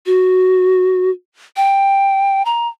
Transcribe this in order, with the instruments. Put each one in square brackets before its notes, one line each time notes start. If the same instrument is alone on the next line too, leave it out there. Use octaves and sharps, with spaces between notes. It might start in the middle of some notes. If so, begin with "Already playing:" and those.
[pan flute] F#4
G5
A#5